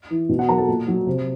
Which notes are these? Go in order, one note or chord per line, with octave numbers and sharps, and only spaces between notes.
E3
B2
F#4 F#5
F#3 A#4 A#5
A4 A5
A#2
F#3
C3